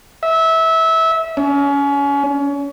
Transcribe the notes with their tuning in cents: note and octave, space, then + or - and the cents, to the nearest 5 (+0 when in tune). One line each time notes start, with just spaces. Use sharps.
E5 -20
C#4 +30